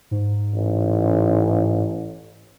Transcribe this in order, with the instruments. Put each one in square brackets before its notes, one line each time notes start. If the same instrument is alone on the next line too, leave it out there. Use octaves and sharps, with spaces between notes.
[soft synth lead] G#2
[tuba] A1